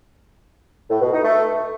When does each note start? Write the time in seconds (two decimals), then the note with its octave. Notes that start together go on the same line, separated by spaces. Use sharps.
0.90 A2
1.01 B2
1.13 D#4
1.24 A3